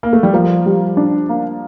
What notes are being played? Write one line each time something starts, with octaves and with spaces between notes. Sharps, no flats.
A#3
A3
G3
F3 A#3
G3
D4
A#3